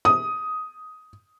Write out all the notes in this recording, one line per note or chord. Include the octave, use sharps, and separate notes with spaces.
D#6